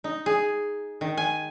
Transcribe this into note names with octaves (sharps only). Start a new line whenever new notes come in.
D#4
G#4
D#3
G#5